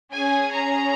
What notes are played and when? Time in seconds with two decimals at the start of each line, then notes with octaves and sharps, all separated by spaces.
0.12 C#4 G#4 G#5
0.51 A#5